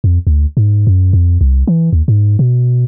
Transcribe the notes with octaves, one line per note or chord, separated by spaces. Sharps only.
F2
D2
G#2
F#2
F2
C2
E3
D#2
G#2
B2